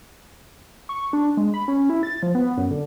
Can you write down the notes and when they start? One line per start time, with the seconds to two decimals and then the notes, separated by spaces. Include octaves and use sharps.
0.89 C#6
1.13 D4
1.37 G#3
1.54 B5
1.68 C#4
1.90 E4
2.03 A6
2.23 F3
2.35 B3
2.57 F#2
2.71 D3